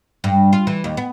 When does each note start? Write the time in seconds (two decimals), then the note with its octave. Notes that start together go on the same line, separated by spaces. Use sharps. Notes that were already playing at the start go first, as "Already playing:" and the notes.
0.24 G2
0.53 F4
0.67 E3
0.84 D#2
0.97 B3